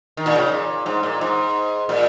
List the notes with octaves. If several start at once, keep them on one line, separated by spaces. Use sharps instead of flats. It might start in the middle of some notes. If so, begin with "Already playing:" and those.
D#3
A#2
C#3
A#2
G#2
A#2
G#2
A#2